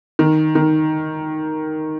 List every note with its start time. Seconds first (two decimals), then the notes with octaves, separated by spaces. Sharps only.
0.19 D#3
0.55 D#3